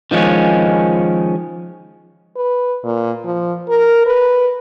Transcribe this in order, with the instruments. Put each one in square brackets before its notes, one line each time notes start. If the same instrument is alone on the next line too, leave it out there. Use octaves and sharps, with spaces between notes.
[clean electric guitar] D#3 F3 G#3 C#4
[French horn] B4
A#2
F3
A#4
B4